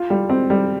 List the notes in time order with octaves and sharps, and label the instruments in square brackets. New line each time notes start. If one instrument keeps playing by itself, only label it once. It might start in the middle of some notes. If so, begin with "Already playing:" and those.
Already playing: [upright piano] F4
G3
C4
G3